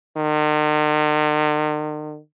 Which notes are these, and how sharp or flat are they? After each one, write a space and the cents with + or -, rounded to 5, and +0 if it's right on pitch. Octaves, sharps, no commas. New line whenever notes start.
D#3 -45